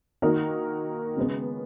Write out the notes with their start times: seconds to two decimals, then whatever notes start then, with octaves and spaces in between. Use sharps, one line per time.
0.22 D#3 A#3 D#4 F#4 A#4
1.16 C#3 G#3 B3